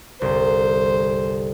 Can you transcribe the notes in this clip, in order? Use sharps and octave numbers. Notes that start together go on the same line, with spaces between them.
G1 C2 C5